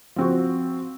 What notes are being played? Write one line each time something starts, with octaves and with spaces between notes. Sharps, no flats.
F3 C4 F#4